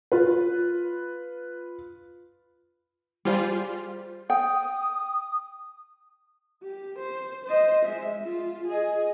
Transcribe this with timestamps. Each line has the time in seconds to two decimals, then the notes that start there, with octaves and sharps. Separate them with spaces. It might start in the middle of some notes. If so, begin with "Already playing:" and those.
0.12 F4 B4
3.25 G3 F4 G#4 C5
4.30 G5 D#6
6.63 G4
6.99 C5
7.45 C5 D#5
7.85 G#3 E5
8.23 F4
8.68 G#4 D#5